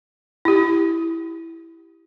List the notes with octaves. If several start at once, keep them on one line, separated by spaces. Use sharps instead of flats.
E4 G4